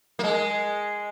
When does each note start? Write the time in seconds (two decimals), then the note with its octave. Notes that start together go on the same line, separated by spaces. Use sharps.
0.19 A#3
0.23 G#3